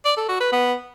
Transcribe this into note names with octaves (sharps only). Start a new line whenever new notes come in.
D5
A4
F#4
B4
B3